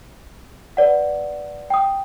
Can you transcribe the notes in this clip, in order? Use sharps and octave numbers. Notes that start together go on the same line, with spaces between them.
B4 D5 F#5
G5 D#6